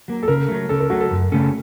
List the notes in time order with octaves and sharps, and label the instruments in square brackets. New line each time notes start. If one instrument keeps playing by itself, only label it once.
[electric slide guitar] F#3 A#3
[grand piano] A4
[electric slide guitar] C#3 [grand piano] A#4
[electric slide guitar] F#3 A3
[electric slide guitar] C#3 [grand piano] A4
[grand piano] A#4
[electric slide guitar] F#3 A3 [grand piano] F#4
[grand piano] A4
[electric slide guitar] F#2
C#3 A3 C#4 A4